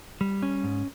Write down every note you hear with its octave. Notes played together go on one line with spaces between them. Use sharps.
G3
C#4
G#2